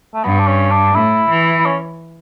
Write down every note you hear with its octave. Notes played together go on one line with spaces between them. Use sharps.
A3
G2 B3
D4
C#4
D4
A2 E4
E3
C#4